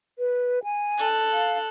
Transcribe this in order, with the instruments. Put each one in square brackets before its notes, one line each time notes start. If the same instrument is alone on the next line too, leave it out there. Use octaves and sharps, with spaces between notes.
[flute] B4
G#5
[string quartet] A4 F#6
[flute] F5